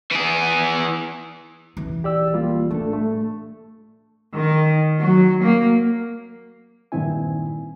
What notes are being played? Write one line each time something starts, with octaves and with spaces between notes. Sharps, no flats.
E3 G#4
D#1 E3
G4 D5 E6
G3 A#3 F4
A2 A3 D4 A4
A3
D#3
F#3
A#3
G2 A#2 D#3 C4 E4 G#5